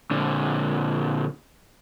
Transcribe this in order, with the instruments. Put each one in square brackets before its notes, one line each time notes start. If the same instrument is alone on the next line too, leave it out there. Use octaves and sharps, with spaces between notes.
[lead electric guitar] A#2 D3